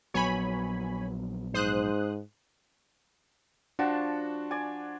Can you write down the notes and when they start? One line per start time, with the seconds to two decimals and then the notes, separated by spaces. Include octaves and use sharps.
0.14 A#1 F#3 B3 C#5 G#5 B5
1.54 G#2 C5 D#6 F#6
3.79 F3 D4 F#4 A5
4.51 D5 G#5